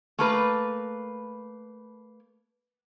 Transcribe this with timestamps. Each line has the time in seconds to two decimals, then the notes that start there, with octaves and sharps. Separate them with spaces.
0.19 A3 A#3 B4